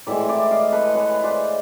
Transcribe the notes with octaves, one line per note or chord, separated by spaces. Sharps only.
A2 E3 G#3 D5 E5
D5 E5
D#5 F5
A4 B4
B4 C#5
C5 D5